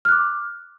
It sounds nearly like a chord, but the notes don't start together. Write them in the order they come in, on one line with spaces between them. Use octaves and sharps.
F6 F#6 D6